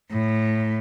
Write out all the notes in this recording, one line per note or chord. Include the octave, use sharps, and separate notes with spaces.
A2